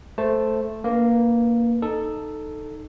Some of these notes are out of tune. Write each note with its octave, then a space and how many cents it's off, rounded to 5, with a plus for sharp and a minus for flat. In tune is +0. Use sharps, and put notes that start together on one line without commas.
A3 -5 C5 +0 A5 +0
A#3 +0 D4 -40 B4 -20
D#4 -15 A4 +0